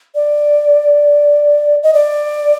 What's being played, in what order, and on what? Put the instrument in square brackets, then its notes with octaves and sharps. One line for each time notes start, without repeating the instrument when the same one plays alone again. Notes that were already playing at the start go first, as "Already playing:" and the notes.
[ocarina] D5
D#5
D5